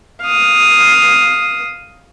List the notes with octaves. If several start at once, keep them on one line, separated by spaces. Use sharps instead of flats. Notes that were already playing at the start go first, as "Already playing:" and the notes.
F5 D#6